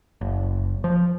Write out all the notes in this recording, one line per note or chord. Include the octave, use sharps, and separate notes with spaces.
F#1
F3